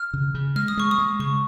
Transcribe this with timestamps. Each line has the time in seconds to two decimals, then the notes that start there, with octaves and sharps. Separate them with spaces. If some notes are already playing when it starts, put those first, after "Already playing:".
Already playing: F6
0.14 C#3
0.34 C#3
0.56 G#3 F6
0.68 D#6
0.77 G#3 C#6
0.91 D#6
0.98 G#3
1.19 C#3 C#6